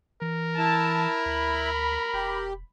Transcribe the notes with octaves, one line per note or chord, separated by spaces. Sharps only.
E3 A#4
E4 A5
D2 B5
E1 G4